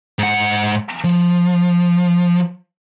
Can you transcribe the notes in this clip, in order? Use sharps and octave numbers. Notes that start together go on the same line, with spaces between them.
G#2 F#5
F3